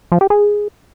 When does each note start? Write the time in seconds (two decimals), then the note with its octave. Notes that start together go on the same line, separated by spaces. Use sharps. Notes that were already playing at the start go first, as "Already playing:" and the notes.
0.12 F3
0.21 G4
0.30 G#4